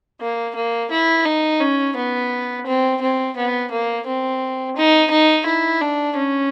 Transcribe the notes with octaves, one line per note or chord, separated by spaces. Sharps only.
A#3
A#3
E4
D#4
C#4
B3
C4
C4
B3
A#3
C4
D#4
D#4
E4
D4
C#4